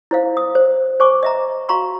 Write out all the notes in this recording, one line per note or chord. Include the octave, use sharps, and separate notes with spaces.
E4 C5 F5
D#6
C5
C5 G#5 C#6 D6
D#5 E5 A#5
F#4 F5 A#5 C6 C#6